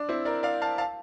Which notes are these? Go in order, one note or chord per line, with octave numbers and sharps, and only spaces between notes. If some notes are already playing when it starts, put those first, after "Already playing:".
Already playing: D4
C4 E4
A#4 D5
D5 F5
F5 A5
F5 A5